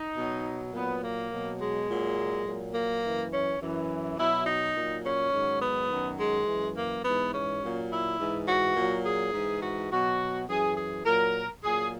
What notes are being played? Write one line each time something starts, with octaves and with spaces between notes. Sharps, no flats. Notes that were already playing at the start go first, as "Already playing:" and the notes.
Already playing: D#4
B2 F#3
A#2 F#3 B3
A#3
B2 F#3
G#3
A#2 F#3
A#2 F#3
A#3
F#2 E3
C#4
F#2 E3
B2 F#3 E4
D#4
A#2 F#3
C#4
G#2 D#3 F#3
B3
F#2 D#3 F#3
G#3
F#2 E3
A#3
G#2 E3 B3
C#4
A#2 F#3
E4
G#2 E3
F#4
A#2 F#3
G#4
G#2 E3
F#4
B2 F#3 F#4
F#2 E3 G#4
G#4
A#2 F#3 A#4
A#2 F#3 G#4